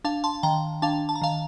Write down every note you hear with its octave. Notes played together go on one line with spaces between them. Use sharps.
D4 F5 A5
A5 C6
D#3 G5 A#5
D4 F5 A5
A5
A#5
D#3 F5 A5